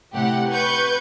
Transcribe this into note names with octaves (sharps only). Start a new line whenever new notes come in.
A2 C3 G4 F#5
B4 C#6 G6 G#6